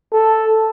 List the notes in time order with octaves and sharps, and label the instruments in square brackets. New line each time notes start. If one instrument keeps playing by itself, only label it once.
[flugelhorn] A4